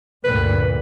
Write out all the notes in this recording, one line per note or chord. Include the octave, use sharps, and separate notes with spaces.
D2 G2 A#2 B4